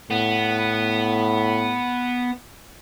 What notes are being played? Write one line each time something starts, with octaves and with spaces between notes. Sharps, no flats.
A2 B3